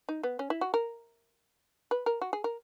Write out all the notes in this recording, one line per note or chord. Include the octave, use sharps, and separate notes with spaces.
D#4
B3
C#4
E4
F#4
A#4
B4
A#4
F#4
G#4
A#4